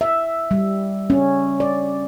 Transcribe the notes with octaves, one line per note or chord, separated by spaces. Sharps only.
E5
G3
C#4
D5